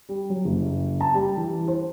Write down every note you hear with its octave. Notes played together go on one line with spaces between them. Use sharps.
G3
F#3
F#1
A5
G3
E3
C5